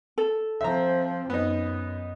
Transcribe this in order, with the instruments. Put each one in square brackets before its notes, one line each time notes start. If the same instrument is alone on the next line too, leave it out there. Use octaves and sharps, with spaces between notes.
[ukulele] A4
[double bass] F3 C4 [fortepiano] E5 A#5
[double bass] F#2 [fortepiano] B3 D#4